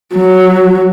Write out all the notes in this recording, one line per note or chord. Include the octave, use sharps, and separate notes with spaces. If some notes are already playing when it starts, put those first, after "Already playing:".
F#3